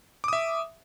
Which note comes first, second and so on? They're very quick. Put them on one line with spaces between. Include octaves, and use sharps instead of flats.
D6 D#6 E5